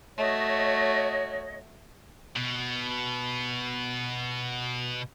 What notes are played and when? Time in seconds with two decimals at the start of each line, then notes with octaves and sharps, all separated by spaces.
0.18 A3 F#4 C#5 D#5
2.36 B2 B3